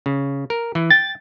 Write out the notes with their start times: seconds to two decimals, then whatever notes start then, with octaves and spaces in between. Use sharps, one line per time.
0.06 C#3
0.50 A#4
0.75 E3
0.90 G5 A6